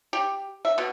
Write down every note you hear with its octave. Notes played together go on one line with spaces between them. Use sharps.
G4
E5
B2